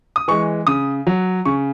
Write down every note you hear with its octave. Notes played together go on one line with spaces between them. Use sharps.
D#6
E3 G#3 C#6
C#3 D#6
F#3
C#3 C#6